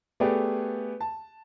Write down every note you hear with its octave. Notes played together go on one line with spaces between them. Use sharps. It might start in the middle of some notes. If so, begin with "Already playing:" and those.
A3 B3 G4 G#4 B4 D5
A5